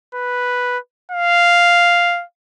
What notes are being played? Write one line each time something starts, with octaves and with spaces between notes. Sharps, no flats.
B4
F5